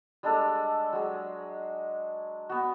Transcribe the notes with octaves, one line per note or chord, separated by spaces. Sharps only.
G3 G#3 D4 A4
F#3 G#3
B3 F#4